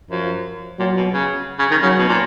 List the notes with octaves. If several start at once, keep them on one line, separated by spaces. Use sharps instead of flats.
F#2 F3
A#2 F#3
B2
C#3
C#3
D#3
C#3 F#3
B2
A#2